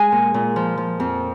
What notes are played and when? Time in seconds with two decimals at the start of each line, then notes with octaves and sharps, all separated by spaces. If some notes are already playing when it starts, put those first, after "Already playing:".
Already playing: G#3 G#4 G#5
0.12 A#2
0.34 A#2
0.56 F3
0.78 F3
1.00 F2